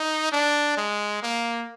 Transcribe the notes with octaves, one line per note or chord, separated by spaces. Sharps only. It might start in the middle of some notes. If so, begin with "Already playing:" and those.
Already playing: D#4
D4
G#3
A#3